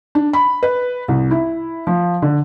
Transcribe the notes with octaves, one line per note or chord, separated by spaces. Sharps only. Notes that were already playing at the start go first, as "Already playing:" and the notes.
D4
B5
B4
C2
E4
F3
D3